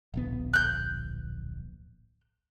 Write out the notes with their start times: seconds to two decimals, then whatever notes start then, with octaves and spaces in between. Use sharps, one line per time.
0.14 D1 A#1 B3
0.53 F#6 G6